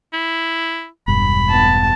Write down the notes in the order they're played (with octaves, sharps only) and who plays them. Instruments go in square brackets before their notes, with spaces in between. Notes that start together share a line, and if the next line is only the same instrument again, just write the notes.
[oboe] E4
[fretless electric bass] E1 G2 [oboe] B5
[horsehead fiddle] B3 A5